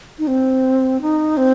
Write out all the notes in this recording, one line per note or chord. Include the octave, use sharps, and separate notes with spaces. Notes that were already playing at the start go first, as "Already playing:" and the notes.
D#4
C4
D#4
C4